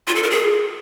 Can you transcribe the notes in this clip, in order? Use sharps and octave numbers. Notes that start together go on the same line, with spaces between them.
F4
A4
A#4
G#4